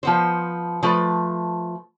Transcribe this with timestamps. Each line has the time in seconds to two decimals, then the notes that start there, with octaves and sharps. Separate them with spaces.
0.03 F3 B3 C5
0.83 F3 A3 B4